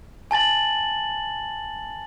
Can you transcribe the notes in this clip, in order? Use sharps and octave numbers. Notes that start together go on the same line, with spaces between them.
G#5 A5 A6 F#7